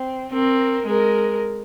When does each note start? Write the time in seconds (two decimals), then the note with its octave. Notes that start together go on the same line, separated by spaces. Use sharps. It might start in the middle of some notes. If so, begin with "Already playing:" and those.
Already playing: C4
0.33 C4 A#4
0.87 G#3 A#4